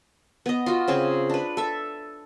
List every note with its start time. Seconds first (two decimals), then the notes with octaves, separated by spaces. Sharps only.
0.46 B3 D#5
0.66 F4 F#4
0.88 C#3 C4 G#4
1.30 D4 B4
1.57 A4 E5